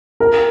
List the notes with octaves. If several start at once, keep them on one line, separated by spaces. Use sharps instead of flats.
A#4